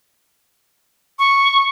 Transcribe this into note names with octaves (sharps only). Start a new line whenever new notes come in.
C#6